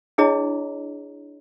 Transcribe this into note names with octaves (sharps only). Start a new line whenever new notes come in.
D4 E4 G#4 C#5 D#5 A#5